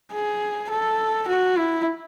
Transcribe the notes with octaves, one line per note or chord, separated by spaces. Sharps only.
G#4
A4
F#4
E4